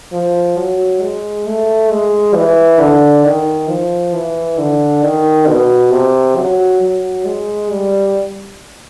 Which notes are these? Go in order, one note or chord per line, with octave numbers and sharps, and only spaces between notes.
F3
F#3
G#3
A3
G#3
E3
D3
D#3
F3
E3
D3
D#3
B2
C3
F#3
F#3
G#3
G3